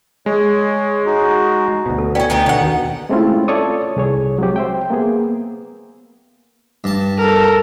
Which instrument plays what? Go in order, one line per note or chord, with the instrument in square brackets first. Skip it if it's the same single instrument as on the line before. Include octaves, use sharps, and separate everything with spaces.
[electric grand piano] G#3 [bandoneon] C#5
[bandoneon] D#4 F#4
[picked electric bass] D2 B2
[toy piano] A4
[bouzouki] B3 C#4 [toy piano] D5 G5
[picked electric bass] D2 [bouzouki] B3 D#4 G4
[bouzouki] B2 F#5 [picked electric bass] D3
[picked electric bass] D#2 D#3
[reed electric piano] G#3 A3 C4 C#4 E4 F4
F4 A4 C#5 D5 C#6 D#6
C2 G#4 C#5
F#3 G#3 C4 G4
C5 E5 G5
A#3 B3 G#4
[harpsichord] G2 A5
[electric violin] A4 A#4